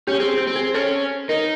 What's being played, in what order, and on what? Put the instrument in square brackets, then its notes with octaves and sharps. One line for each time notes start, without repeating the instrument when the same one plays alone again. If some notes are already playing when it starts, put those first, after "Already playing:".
[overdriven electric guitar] C#4 [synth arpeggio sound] G4
[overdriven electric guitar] C4 [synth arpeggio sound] G#4
[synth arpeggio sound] G4
[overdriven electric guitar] C4
[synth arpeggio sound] G#4
[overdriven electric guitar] C#4 [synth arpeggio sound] A4
[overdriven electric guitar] D#4 [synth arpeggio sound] A#4